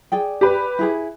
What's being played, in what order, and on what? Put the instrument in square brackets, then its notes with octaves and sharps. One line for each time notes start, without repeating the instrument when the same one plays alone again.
[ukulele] G#4 D5 G5
[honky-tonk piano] G4 B4
[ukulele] E4 G#4 B5